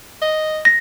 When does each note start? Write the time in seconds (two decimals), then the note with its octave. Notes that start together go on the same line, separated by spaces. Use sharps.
0.22 D#5
0.65 A#6